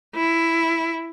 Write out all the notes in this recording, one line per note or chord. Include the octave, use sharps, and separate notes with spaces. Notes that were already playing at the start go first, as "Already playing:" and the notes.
E4